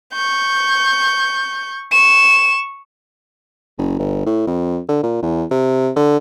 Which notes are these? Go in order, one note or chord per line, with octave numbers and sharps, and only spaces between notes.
C#6 G6
C#6 E7
F#1
G1
A2
F2
D3
A#2
E2
C3
D3